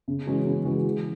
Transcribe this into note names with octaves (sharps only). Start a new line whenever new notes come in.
C#3
E3 G#3 C#4 F#4
C#3
E3 G#3 C#4 F#4
E3